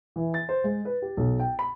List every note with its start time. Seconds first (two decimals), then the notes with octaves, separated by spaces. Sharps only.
0.16 E3
0.34 A6
0.49 C5
0.64 G#3
0.85 B4
1.02 G4
1.17 B1
1.40 G5
1.59 B5